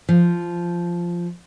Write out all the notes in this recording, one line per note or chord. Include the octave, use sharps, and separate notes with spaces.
F3